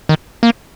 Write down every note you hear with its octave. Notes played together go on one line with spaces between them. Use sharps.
D#3
A#3